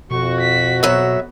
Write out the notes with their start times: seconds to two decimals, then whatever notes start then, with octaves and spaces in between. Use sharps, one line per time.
0.11 F2 B2 F#4 C#6
0.40 B6
0.83 F#3 B3 E5